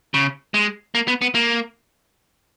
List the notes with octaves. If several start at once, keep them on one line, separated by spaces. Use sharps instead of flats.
C#3
G#3
A#3
B3
B3
A#3